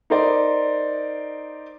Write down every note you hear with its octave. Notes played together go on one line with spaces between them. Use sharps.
D#4 A#4 C5 D5